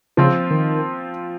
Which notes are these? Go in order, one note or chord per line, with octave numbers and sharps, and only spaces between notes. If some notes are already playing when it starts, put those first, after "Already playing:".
C#3 F3 C4 F4
D#3